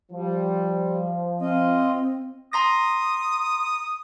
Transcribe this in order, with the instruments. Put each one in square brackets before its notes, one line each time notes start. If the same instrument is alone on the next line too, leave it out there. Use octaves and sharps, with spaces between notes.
[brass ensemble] F3 [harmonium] G3
[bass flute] C4 [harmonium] F4 D#5
[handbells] A#5 C6 A#6 [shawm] D#6